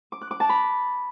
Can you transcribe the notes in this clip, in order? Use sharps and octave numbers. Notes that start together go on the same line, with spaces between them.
D6
F#6
D6
A5
B5